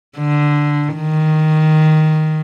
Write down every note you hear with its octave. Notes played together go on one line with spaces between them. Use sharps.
D3
D#3